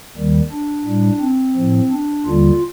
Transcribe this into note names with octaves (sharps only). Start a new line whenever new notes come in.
D#2 D#3 G3
D4
A2 G3
C4
A2 F3
D4
D#2 D3 G3 F4